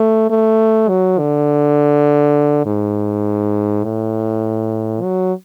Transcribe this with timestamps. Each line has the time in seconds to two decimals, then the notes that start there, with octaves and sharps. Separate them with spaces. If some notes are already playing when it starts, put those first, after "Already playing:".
Already playing: A3
0.30 A3
0.88 F#3
1.19 D3
2.66 G#2
3.84 A2
5.02 F#3